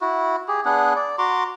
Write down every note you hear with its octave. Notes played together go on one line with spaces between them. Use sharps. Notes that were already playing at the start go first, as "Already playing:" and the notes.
E4 F#4
G4 G#4
B3 D4 G#4 F#5
D5
F#4 A#5 C6 D6